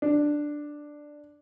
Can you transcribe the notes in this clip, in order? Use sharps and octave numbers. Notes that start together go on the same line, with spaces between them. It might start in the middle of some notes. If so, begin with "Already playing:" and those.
D4